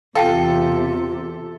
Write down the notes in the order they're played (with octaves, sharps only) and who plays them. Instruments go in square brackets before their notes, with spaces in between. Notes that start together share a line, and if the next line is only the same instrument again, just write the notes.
[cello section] E2 C3 [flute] F4 [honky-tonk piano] A4 [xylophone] F5 G5 A5